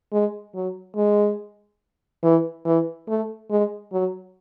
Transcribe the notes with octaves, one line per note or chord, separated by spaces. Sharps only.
G#3
F#3
G#3
E3
E3
A3
G#3
F#3